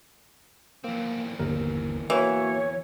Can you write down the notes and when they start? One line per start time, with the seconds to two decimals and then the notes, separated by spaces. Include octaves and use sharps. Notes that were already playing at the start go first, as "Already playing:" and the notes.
0.84 E2 A#3 C4
1.39 G1 D#2 A#4
2.10 E3 A#3 F#4 C#5